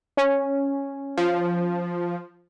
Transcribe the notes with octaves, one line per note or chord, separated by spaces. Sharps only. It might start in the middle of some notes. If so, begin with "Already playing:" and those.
C#4
F3